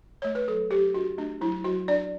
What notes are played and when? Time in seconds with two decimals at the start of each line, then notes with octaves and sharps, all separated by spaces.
0.22 A3 C#5
0.35 B4
0.48 F#3 A4
0.71 F#3 G4
0.94 D4 F#4
1.18 A3 D4
1.41 F#3 E4
1.64 F#3 F#4
1.88 D4 D5